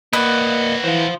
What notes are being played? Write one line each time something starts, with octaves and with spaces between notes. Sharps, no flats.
A#3 E4 F#4 B4 D5 D#5
E3 C5 F5